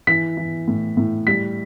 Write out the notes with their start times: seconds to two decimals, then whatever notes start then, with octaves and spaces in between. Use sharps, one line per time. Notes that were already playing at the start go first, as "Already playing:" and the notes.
0.07 E3 B6
0.37 E3
0.68 A2
0.97 A2
1.27 G3 B6